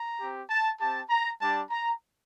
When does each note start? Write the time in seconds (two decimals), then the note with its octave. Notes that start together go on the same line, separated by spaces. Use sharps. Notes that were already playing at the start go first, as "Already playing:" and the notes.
Already playing: A#5
0.19 C4 G4
0.50 A5
0.80 C4 G4 A5
1.10 A#5
1.41 G3 D4 G4 A5
1.71 A#5